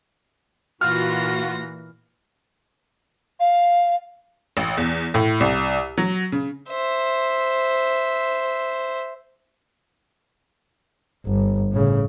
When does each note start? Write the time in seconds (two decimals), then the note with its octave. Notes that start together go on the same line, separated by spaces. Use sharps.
0.81 A#2 E3 F4 F#4 F6 A#6
3.40 F5
4.57 A1
4.77 E2
5.14 A2
5.40 C2
5.98 F#3
6.32 C#3
6.70 C5 E5
11.26 G1
11.72 A2 C#3